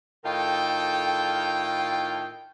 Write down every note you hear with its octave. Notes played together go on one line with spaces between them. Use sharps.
A2 D#3 D#4 F4 A4 G5